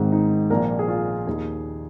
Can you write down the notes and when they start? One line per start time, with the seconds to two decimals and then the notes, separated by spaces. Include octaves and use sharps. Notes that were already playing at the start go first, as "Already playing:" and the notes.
Already playing: G#1 G#2 D#3 C4
0.12 D#4
0.50 A#1 A#2 F3 A#4
0.79 G#4
0.88 F4
1.27 D#2 D#3 G#4